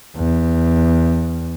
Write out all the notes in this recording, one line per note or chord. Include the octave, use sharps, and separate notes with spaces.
E2